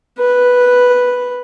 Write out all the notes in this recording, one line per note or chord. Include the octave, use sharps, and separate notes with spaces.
B4